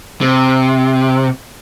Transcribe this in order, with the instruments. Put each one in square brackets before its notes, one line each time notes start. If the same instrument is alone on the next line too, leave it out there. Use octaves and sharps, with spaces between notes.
[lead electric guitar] C3